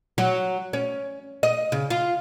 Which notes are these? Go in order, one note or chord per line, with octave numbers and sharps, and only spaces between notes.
F#3
C#4
D#5
C#3
F4